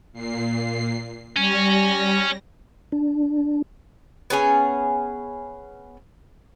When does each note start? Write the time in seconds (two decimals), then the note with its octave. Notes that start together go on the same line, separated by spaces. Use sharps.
0.13 A#2 C7
1.36 G3 C#4 A#6
2.92 D4
4.30 B3 C#4 G#4 G#5